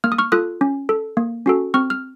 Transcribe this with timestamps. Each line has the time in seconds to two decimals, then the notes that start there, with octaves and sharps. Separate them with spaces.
0.04 A#3 F6
0.12 D#6
0.18 C#6 F6
0.32 F4 A4 D#6 F#6
0.61 C#4
0.89 A4
1.17 A#3
1.46 C#4 F#4 A4
1.74 C4 C#6 F6
1.90 F6